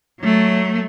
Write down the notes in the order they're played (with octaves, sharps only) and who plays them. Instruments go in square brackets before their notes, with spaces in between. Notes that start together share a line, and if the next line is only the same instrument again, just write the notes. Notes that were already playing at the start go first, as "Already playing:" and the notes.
[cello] F#3 A3